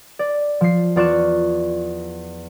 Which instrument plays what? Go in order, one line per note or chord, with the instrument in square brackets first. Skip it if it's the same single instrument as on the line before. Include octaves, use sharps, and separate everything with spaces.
[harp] D5
F3 C7
E2 F4 D5 C#6 F#6 E7